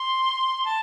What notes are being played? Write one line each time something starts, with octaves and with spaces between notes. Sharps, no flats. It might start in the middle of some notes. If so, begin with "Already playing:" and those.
Already playing: C6
A5